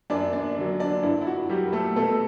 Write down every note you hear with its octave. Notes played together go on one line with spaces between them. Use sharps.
F#2 D4 D5
D4 D5
D3 F#3
D4 D5
G2 E4
E4
F#4
F#3 G3 G4
A3 A4
B2 A3 A4